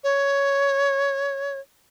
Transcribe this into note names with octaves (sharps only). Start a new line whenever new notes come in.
C#5